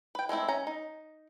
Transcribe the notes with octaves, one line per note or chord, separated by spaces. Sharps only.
B4 G5
G#3 A3 C4 E4
C#4 A#5
D#4